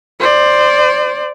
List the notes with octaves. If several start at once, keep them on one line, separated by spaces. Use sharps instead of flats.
C5 D5